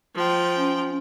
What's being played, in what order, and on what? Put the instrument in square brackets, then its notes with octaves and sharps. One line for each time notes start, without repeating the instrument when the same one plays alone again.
[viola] F3 G5
[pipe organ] C#4